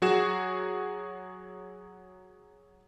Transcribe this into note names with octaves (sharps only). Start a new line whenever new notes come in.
F#3 F#4 G#4 E7